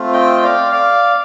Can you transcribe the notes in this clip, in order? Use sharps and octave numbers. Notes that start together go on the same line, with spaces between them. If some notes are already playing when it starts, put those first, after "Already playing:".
Already playing: A3 C4 F4
D#5 G5
D5 F5
D5 F5